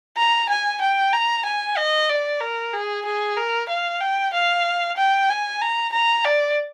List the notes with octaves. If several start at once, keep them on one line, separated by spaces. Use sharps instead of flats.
A#5
G#5
G5
A#5
G#5
D#5
D5
A#4
G#4
G#4
A#4
F5
G5
F5
G5
G#5
A#5
A#5
D5